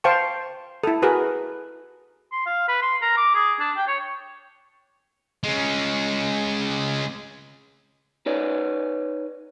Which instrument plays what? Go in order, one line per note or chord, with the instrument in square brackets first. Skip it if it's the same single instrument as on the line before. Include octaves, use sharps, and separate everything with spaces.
[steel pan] C5 F5 G5 A5 C#6
E4 A4
F#4 G#4 A#4 B4
[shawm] C6
F5
B4
C6
A#4
D6
G#4
D4
G5
C#5
[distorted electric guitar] G#3 C#4
[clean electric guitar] D#4 B4 C#5 D5